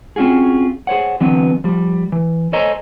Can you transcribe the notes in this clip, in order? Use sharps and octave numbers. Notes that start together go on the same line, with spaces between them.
C4 C#4 F4 F#4 G#4
G#4 C5 C#5 F#5
D3 E3 F#3 B3 C4
F3 G3
E3
A4 C5 C#5 D#5 G#5 A#5